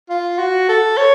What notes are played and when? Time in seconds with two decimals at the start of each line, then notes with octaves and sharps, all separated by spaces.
0.10 F4
0.39 F#4
0.69 A4
0.98 C#5